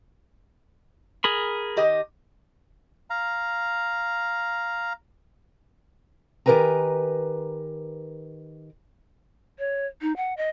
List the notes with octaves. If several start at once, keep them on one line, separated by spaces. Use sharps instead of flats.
G#4 A#4 B5
D#3 G4 D#5
F5 A#5
D#3 G4 A#4 B4 G#5 A#5
C#5
D#4
F#5
D#5